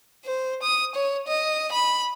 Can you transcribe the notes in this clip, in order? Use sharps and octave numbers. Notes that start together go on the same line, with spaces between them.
C5
D#6
C#5
D#5
B5